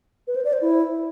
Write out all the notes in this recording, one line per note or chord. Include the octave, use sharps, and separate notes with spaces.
B4
C5
D5
C5
E4